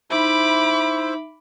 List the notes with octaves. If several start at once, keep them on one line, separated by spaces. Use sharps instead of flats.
D#4 E4 C5 E5 B5 D6